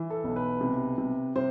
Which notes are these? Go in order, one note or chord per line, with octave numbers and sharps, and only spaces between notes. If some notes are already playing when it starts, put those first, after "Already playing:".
Already playing: E3
A4
B1
B4
C3
C3
C3 C5